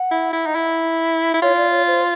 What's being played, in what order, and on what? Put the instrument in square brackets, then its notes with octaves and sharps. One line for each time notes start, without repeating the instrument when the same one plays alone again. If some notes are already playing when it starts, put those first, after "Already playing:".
Already playing: [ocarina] F#5
[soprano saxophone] E4
E4
D#4
E4
E4
[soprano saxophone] F4 [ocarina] C#5
[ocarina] D5
C#5
C5